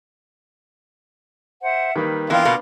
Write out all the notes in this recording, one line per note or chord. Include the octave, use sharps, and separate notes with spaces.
C5 E5 F#5
D#3 G3 A#3 B4
E3 A#3 B3 D4 F4 G5
B2 A#3 D6